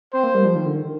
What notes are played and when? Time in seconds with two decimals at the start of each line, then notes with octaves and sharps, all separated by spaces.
0.13 C4 C5
0.24 A#3
0.35 G3
0.45 F3
0.55 D#3
0.66 D3
0.76 D#3